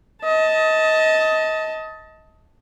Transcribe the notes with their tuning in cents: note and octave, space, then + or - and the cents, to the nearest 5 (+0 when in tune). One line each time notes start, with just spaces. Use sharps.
D#5 +25 A5 +0